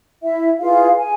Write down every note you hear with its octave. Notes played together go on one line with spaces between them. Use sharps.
E4 E5
E4 F4 G#4 B4 F5
G#4 G#5